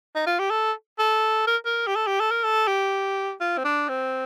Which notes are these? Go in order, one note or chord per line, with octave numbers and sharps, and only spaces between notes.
D#4
F4
G4
A4
A4
A#4
A#4
G4
A4
G4
A4
A#4
A4
G4
F4
C4
D4
C4